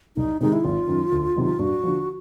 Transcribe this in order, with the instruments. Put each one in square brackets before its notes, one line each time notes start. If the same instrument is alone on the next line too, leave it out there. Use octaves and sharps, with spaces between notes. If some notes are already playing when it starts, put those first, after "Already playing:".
[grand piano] C2 [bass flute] D#4
[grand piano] C3 D#3 G#3 [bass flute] D#4
[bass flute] E4
[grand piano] G#1 [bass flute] F4
[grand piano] F#2 D#3
D2
C3 D#3 F#3
[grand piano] G2 [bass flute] F#4
[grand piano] D3 F3